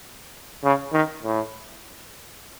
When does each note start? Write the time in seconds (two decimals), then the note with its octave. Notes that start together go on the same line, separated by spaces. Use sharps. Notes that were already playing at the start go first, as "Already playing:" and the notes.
0.64 C#3
0.93 D#3
1.23 A2